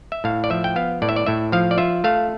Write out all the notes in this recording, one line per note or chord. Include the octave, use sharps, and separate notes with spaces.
E5
A2 F5
D5
F3 E5
G5
B3 F5
A2 D5
E5
D5
A2 E5
F3 F5
D5
F4 E5
A3 F5